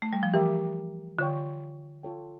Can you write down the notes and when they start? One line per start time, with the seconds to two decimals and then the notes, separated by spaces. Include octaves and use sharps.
0.02 A3
0.13 G3
0.23 F3
0.34 E3 G4 A#4 E5
1.18 D3 F4 C#5 G5
2.03 F4 A4 C#5 G5